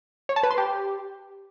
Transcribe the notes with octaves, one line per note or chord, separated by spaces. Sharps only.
C#5
A5
B4
C6
G4